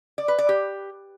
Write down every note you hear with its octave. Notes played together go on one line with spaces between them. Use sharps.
D5
B4
D5
G4